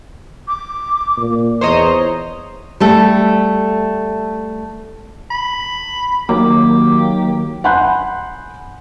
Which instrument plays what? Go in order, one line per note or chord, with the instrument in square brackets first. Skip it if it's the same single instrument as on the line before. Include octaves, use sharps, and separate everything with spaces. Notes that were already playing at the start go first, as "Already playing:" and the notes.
[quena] D6
[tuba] A#2
[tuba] E2 [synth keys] C5 C#5 D#5 [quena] A#5
[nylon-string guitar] G3 A3 A4
[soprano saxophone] B5
[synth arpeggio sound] D#3 F#3 A#3 [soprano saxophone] G4 [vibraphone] D6
[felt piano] F#5 G#5 B5 C6 F#6 G6